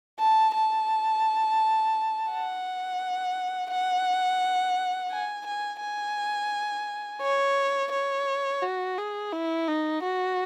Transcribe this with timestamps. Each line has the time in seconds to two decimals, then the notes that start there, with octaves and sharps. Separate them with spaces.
0.20 A5
0.55 A5
2.30 F#5
3.70 F#5
5.11 G#5
5.46 G#5
5.81 G#5
7.22 C#5
7.91 C#5
8.62 F#4
8.98 G#4
9.32 E4
9.68 D#4
10.02 F#4